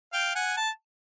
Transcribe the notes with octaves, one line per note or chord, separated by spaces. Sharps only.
F5 G5
F#5 G#5
A5